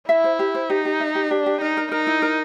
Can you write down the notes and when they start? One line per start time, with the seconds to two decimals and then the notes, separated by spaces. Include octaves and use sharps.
0.09 E4 E5
0.24 C5
0.39 G4
0.55 C5
0.70 D#4 G4
0.85 G4
1.00 E5
1.15 G4
1.31 D4 G4
1.46 G4
1.61 D#4 A#4
1.77 A#4
1.92 D#4 A#4
2.07 E4
2.22 A#4